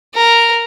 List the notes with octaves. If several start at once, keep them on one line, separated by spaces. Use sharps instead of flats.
A#4